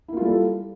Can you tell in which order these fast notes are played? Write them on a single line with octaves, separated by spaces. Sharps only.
E4 A#3 F4 G3 A4